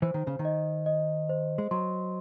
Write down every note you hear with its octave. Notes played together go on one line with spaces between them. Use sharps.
E3 C5
D#3
C#3
D#3
D#5
D#5
C5
G#3
F#3 C6